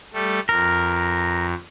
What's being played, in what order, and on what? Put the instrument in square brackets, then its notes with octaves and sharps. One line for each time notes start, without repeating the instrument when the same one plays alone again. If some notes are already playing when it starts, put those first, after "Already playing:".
[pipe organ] G3 A3 A4
[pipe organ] F2 [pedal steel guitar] A#4